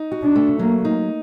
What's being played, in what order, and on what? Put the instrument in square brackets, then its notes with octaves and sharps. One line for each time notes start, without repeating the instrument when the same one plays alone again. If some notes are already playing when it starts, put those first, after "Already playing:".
Already playing: [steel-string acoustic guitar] D#4
F#4
[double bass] D4
[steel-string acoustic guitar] A3
[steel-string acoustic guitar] F#3 [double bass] A#3
[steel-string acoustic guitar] D#4